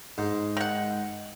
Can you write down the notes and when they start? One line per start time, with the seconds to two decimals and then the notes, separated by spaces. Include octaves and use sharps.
0.18 G#2
0.57 D#3 F#5